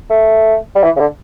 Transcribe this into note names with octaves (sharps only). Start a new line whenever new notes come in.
A3
G3
E3
C#3
D3